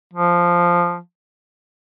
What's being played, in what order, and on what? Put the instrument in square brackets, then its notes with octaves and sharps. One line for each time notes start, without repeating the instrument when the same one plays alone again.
[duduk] F3